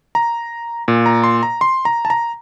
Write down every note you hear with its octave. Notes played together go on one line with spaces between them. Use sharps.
A#5
A#2
A#5
C6
A#5
C6
A#5
A5
A#5